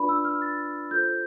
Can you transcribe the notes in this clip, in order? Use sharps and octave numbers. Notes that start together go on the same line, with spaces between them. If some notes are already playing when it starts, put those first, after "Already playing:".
Already playing: D4 F4 B4 D5 B5
E6
F6
A6
F4 A4 C5 G6